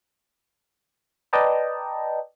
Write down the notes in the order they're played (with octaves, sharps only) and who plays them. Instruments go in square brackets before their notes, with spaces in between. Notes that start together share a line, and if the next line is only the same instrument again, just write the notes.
[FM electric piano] B4 D5 D#5 G5 A5 A#5